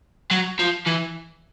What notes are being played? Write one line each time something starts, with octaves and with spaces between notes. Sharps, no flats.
F#3
F3
E3